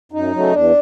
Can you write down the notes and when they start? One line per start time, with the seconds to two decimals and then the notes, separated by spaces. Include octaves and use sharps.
0.12 F#2 D#4
0.32 C#3 F#3 A3
0.52 E2 D4